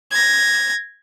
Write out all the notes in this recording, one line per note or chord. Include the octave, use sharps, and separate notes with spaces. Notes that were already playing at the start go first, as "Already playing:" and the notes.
G#6 A#6